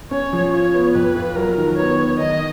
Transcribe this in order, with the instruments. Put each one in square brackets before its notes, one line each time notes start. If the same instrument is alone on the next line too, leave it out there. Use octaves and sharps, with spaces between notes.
[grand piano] C#4 [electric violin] C#5
[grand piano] F3
[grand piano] F4 [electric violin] C#5
[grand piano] B3
[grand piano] F2 [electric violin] B4
[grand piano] F4
[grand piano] F#3 [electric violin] A#4
[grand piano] D#3
[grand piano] B3 [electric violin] C#5
[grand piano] B3
[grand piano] D#3 [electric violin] D#5